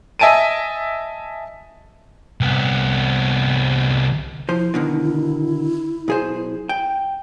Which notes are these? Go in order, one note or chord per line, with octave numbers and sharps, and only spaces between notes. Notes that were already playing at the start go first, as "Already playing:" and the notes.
D#5 E5 G#5 A5 D7 D#7
C2 B3
F3 E4 C5
B2 D3 D#3
B1 G#4 C5
G5